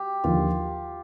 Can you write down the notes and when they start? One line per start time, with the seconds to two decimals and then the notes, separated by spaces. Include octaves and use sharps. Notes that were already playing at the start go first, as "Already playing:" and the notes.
Already playing: G4
0.24 D#2 D3 F3 F4